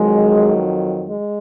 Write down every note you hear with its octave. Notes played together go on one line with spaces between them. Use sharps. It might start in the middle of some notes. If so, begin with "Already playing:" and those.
Already playing: F2 D#3 F#3 G#3
G#3